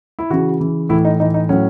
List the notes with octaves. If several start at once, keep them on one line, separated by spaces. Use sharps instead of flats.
E4
C#3 E3 F#4
C#3 E3
A2 E3 E4
D#4
A2 E3 D#4
D#4
A2 F#3 C#4